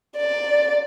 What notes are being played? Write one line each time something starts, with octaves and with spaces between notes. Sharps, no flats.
D5